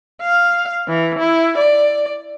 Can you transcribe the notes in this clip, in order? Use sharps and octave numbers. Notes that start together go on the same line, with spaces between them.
F5
E3
E4
D5